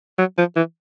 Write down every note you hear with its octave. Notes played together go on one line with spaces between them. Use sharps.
F#3
F3
E3